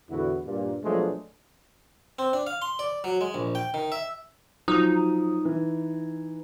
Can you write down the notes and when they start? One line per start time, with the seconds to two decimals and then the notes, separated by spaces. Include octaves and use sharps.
0.10 E2 A2 D3 E4 F#4
0.46 G2 A#2
0.84 B2 F3 F#3 G#3 A3 D4
2.19 C4
2.33 D4
2.47 F5
2.62 C6
2.79 D5
3.04 F#3
3.21 G#3
3.34 A#1
3.55 G5
3.74 D#3
3.92 E5
4.68 F3 F#3 D#4 D#6
5.45 E3